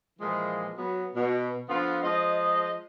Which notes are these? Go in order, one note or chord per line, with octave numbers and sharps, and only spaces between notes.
A#2 E3 F3 G#3
F#3 B3
B2
D3 F3 B3 F4
F3 G#3 D#5